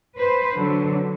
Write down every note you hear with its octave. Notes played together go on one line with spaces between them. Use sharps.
B4 C5
D3 F#3